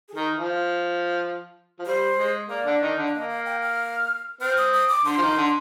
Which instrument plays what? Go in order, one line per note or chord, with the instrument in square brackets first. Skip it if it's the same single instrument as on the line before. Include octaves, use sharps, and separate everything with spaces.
[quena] G#4
[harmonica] D#3 [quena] A#4
[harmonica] F3
F3
[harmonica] G3 [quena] C5
[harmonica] G#3
[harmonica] A#3 [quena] D5
[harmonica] D3 D4
D#3 D#4
D3 D4
[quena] F5
[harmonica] A#3 [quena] D#5
[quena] F5
G5
F6
[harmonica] C4 [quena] F6
[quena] D#6
D#6
D6
[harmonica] D3 [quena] C6
[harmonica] F3
D#3
D3